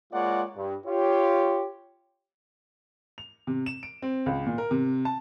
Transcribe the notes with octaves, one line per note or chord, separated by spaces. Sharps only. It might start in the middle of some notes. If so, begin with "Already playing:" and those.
G#3 A#3 F4 C#5 D5 F#5
G2
F4 G4 C#5
F7
C3
E7
D7
C4
C#2
A#2
A#4
C3
A5